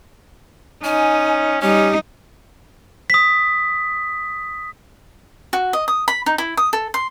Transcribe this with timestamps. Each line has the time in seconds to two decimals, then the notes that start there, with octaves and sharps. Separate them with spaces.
0.84 C#4 D#4 G#5
1.62 G3 C#4 D#4 G4
3.10 D#6 B6
5.53 F#4
5.73 D#5
5.88 D#6
6.08 B5
6.26 D#4
6.38 E4
6.57 D#6
6.73 A4
6.94 C6